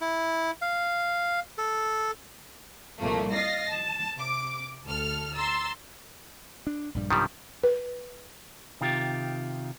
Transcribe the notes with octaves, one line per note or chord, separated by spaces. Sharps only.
E4
F5
A4
C2 F2 A#2 A3 A#3
D#5 F5 A6 A#6 C7
A5
C3 D6
D2 A4 F6
A#5 C6 E6 A6
D4
A#1 G2 G3
B1 G2 C3 D#3 F3 G3
B4
C3 D#3 F4 G4